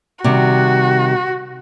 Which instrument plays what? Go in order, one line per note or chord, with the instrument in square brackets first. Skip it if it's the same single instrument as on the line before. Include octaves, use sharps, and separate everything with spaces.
[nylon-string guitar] C3 D#3 G3 [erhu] F#4